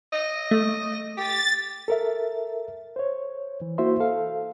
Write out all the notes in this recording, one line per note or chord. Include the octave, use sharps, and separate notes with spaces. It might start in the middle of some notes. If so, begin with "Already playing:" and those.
D#5
A3
G4 A6
A4 A#4 E5
C5 C#5
E3
A#3 E4 F#4 C5 E5 C6
A4 F5